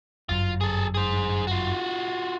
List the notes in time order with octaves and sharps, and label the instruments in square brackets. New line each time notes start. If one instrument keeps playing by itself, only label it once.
[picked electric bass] G1 F#2 [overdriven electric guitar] F4
[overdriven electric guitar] G#4 A4
G#4 C5
F4 F#4